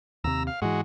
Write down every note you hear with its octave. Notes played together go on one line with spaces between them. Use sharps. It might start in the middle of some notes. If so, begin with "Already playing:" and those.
D#2 C3 A#5 E6
F5
G#2 E3 G#3 F#4